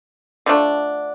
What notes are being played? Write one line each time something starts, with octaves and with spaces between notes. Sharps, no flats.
D3 F3 A3 D4